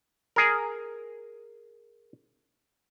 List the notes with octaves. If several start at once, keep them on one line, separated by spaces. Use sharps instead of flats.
G#4 A#4